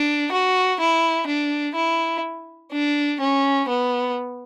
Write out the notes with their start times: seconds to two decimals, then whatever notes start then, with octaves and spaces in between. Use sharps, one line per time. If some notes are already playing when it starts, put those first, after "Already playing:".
Already playing: D4
0.32 F#4
0.80 E4
1.27 D4
1.76 E4
2.72 D4
3.21 C#4
3.69 B3